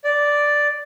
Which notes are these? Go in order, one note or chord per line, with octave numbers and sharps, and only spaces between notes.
D5